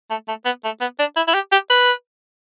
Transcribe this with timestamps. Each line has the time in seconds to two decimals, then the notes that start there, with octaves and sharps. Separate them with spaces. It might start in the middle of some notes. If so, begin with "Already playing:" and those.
0.10 A3
0.28 A3
0.45 B3
0.64 A3
0.81 B3
0.99 D4
1.17 E4
1.28 E4
1.34 G4
1.52 G4
1.70 B4